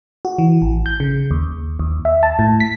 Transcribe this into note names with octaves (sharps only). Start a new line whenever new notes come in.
F#4
E3
A1
G6
C#3
D#2
D#2
E5
A5
A2
B6